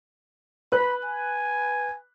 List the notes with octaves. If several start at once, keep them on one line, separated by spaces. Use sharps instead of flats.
B4 B5 F#6
G#5